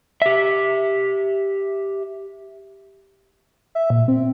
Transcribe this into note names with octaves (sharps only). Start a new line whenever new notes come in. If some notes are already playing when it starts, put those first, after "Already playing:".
G4 E5
E5
A#2
C4